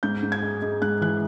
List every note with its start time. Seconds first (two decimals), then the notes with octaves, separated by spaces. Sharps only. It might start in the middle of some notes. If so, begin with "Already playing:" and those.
0.03 G#2 G6
0.23 G#2
0.32 G#6
0.42 G#3
0.62 G#3
0.82 G#2 F#6
1.01 E3 F#6